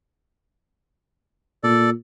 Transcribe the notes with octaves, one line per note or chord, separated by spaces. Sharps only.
A#2 A4 D5